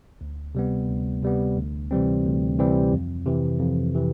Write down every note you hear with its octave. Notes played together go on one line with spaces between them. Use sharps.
D2
C3 G3 B3
D2
C3 G3 B3
D2
C3 E3 G3 C4
D2
C3 E3 G3 C4
F2
C3 E3
F2
C3 E3